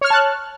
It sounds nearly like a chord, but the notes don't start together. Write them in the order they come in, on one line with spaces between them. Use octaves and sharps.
C#5 F6 C#6 A5 F#6